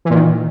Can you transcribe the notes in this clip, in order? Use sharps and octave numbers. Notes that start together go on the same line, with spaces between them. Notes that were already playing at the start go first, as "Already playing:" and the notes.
A#2 D#3 E3